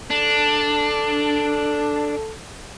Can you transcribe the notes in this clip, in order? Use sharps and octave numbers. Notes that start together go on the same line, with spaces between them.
D4 A4